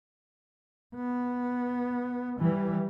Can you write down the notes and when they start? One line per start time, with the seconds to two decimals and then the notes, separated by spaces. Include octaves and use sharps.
0.95 B3
2.40 E3 G3